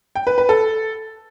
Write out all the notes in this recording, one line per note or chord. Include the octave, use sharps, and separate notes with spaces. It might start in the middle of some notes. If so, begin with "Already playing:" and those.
G5
B4
B4
A4